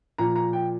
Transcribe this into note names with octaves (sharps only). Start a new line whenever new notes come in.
A#2 F3 A#5
A#5
G5